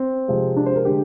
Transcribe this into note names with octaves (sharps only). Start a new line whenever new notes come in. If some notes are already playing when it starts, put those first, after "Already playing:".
Already playing: C4
C3 F3 G#3
D4
C5
A#4
D3 G#3 G4